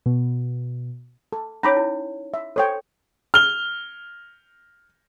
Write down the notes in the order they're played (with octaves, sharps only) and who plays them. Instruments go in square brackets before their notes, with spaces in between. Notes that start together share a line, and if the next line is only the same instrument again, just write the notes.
[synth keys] B2
[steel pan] A4
[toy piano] C#4 D#4 C#5 [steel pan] A#5 B5 D6
[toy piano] E4
[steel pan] E5
[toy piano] A4 [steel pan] C5 C#5 G5
[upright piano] F6 G7